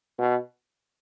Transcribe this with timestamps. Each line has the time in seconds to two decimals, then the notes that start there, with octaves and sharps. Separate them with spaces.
0.18 B2